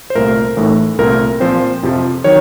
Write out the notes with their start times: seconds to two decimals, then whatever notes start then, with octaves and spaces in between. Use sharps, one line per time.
0.10 C5
0.15 C2 A#2 A3 A#4
0.56 A1 A2 A3 D#4
0.98 C2 A#2 A3 C4 A#4
1.40 A#2 F3 C4 C5
1.83 F2 C3 F3
2.24 D#3 F#3 C#5